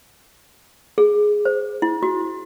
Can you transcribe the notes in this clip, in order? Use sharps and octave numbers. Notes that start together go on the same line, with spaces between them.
G#4
C5
E4
F#4